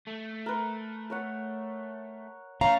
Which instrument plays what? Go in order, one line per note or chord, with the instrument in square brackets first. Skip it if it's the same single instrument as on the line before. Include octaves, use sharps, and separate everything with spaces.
[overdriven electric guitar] A3
[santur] A#4 B4
A#4 C#5 F#5
[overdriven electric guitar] A3 [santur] C#4 [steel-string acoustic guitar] F5 A#5